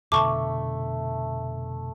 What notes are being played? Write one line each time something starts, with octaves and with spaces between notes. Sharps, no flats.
F1 B2 D3 A3 A5 C#6 D6